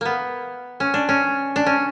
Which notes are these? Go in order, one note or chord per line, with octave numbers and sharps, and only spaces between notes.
A#3 B3
C#4
D4
C#4
D4
C#4